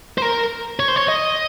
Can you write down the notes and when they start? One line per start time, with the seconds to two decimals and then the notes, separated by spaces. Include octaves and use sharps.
0.18 C5
0.22 A#4
0.80 C#5
0.88 C5
0.96 C#5
1.08 D#5